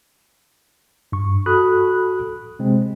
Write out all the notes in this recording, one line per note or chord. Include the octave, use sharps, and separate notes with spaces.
G2 C#6
F#4 A4 B5 D#6 F#6
C3 G#3 C4